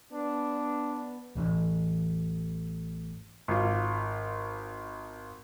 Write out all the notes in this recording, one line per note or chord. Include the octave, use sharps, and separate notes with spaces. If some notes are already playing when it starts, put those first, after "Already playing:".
B3 D4
A1 E2
G#1 F4